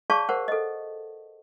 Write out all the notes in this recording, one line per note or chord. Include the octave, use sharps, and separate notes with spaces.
G#4 C#5 D5 F5 A5 C#6
A#4 C5 F#5
A4 D#5